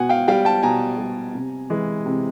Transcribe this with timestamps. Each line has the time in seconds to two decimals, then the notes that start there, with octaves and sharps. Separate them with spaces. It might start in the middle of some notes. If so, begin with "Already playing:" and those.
Already playing: B2 F#5 G#5
0.09 F5 G5
0.28 G3 F5 G5
0.45 G5 A5
0.63 B2 G#5 A#5
0.98 G3
1.35 C3
1.70 E3 G#3
2.06 C3